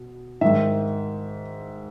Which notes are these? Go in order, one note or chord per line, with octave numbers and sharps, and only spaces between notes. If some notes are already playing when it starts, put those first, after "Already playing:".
Already playing: B2
G#2 D#3 E5